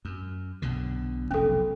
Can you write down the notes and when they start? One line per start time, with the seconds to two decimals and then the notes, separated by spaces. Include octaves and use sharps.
0.05 F#2
0.62 B1 B2 D3
1.31 F1 B1 C#4 A4